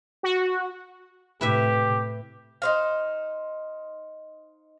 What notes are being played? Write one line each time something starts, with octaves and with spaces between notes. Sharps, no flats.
F#4
A2 C3 E4 G4 B4 E5
D#4 C5 F5